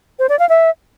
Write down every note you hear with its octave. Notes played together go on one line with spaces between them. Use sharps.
C5
D5
F5
E5